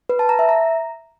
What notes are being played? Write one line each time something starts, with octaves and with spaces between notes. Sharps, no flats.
B4
A5
A#5
E5
A#5